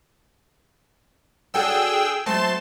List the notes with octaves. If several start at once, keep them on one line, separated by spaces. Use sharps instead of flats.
D4 F#4 G#4 A4 G5 E6
F#3 A3 C4 A5 C6 E7